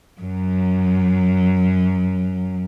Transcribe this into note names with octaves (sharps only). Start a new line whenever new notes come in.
F#2 F#3